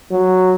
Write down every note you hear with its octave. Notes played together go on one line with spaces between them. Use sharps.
F#3